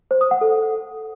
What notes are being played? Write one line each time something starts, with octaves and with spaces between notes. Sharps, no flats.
C5
D#6
F#5
A4